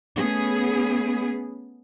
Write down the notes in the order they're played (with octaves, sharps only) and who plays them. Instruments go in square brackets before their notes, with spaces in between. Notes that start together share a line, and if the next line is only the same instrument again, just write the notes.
[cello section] A3 B3 C#4 G#4